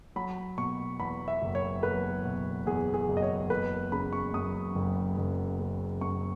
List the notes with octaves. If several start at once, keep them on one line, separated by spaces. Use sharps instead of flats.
F#3 B5
B2 C#6
E2 B5
E5
F#1
C#5
F#3 B4
B2
E2 G#4
G#4
F#1
D#5
C#5
F#1 B4
C#3 B5
C#6
F#2 D#6
F#1
F#1
C#3
F#2 C#6